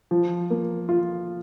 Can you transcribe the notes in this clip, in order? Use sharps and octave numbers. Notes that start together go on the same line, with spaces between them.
F3
A#3
F4